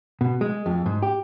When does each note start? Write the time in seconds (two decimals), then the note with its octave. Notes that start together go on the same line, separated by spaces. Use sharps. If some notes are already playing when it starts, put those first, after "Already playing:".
0.21 B2
0.41 G#3
0.66 F2
0.86 G#2
1.02 G4